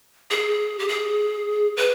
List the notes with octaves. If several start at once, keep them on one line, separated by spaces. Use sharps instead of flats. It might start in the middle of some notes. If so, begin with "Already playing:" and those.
G#4
G4
G#4
B4